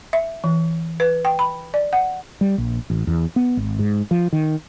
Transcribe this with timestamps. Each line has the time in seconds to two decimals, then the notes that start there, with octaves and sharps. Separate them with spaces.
0.13 E5
0.44 E3
1.00 B4
1.25 G5
1.39 B5
1.74 D5
1.93 F#5
2.41 G3
2.58 A#1
2.90 A1
3.07 E2
3.36 B3
3.57 G#1
3.79 G#2
4.11 F3
4.33 D#3